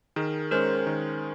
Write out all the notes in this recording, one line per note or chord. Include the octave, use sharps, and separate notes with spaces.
D#3 G#4 A#4
G#3 C#4 A#4 C5
D#3